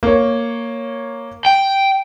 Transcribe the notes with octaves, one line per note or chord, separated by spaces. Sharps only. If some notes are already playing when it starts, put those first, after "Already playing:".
A#3 C#5
G5